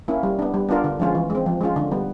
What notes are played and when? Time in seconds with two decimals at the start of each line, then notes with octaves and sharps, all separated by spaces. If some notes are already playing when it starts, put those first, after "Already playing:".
0.08 A#3 C#4 E4
0.23 G3
0.39 B3 D4
0.54 G3
0.69 B3 D4 F4 A#4
0.84 D3
1.00 F3 G#3 C#4 F4
1.15 E3
1.30 G#3 C4
1.46 F3
1.61 G#3 C#4 F4
1.76 D3
1.91 G3 B3